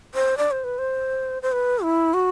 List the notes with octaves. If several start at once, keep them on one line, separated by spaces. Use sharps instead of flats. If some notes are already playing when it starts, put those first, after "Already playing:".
C5
D5
C5
B4
C5
C5
B4
E4
F#4